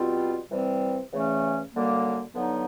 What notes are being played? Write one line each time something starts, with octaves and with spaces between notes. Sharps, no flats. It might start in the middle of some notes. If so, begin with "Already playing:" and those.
Already playing: B2 G3 C4 F4
C3 E3 G3 C4
E2 C#3 E3 A3 C#4
F#2 D3 G3 A#3
G2 D3 F#3 B3 D#4